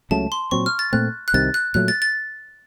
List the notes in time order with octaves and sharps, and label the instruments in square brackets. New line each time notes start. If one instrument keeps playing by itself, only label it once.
[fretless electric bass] C#2 C#3 F#3 A3 [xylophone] A5
[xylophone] C6
[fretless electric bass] A#2 F#3 C4 [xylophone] C#6
[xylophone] F6
A6
[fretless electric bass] A#2 A3 C4 [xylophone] F#6
[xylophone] F#6
[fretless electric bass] C2 C3 D#3 [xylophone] A6
[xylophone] F#6
[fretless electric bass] A#2 F#3 A3 [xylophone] F#6
[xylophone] A6
A6